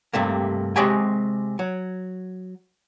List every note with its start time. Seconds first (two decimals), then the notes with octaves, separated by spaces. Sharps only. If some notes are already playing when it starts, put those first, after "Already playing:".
0.13 G2 C3 A3 A#3
0.76 C3 G#3 F#4 G4 G5 G#5
1.59 F#3